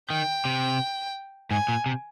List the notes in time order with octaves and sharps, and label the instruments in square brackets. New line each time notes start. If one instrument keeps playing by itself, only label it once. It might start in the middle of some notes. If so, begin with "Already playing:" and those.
[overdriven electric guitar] D#3 [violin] G5
[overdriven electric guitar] C3
[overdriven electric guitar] G#2 [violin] G#5
[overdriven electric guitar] A#2
C3